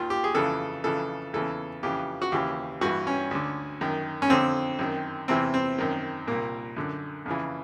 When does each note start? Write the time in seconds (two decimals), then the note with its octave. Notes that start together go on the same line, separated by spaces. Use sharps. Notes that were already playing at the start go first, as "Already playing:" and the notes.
Already playing: D#2 D#3 F4
0.10 G4
0.24 G#4
0.35 F2 C#3 E3 A4
0.84 F2 C#3 E3 A4
1.34 E2 C#3 E3 A4
1.83 F2 C#3 E3 G4
2.22 F#4
2.32 D#2 C#3 E3 G4
2.81 G2 E3 F#4
3.07 C#4
3.31 D2 D3
3.81 F#2 D#3
4.22 C#4
4.30 F2 D3 C4
4.79 F#2 D#3
5.28 E2 C3 E3 C4
5.54 C4
5.78 F#2 D#3
6.27 C2 A#2 A#3
6.76 F#2 D3
7.26 F2 C#3 E3